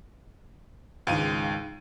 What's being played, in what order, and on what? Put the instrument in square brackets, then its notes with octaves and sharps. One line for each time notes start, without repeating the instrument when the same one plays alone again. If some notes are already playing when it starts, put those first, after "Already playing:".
[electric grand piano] C#2 F5 D#7 [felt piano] G#2 D#3